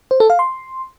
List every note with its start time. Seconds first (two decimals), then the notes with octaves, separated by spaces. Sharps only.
0.11 C5
0.20 A4
0.30 F5
0.39 C6